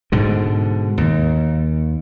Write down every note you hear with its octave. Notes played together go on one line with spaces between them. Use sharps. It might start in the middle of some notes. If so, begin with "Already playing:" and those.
G#2 B2 D3
D#2